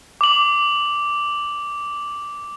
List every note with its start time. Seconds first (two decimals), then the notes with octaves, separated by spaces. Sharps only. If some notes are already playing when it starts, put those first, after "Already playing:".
0.21 D6 F#7